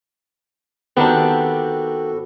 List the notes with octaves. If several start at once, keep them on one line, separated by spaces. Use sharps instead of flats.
D#3 B3 C4 D4 F#4 G4 A4